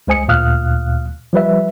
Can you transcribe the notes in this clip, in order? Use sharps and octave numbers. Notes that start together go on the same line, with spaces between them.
C#2 G#3 C5 G#5 D#6 C#7
D2 A#2 F5 D#6 F6 F#6
F3 G3 B4 E5